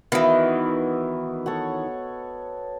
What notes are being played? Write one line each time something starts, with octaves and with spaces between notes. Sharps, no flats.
D#3 E3 B3 F#4 D#5
A4 C#5 F#5